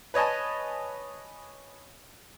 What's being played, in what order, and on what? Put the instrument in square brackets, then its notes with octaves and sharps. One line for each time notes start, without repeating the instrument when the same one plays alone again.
[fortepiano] B4 C#5 D#5 G#5 A5